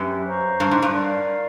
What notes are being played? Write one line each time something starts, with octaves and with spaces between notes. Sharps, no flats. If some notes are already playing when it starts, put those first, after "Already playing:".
Already playing: F#2 G4 B4 E5
C5 F5 A#5 C#6
G2
G#2
G2
A#4 D5 F5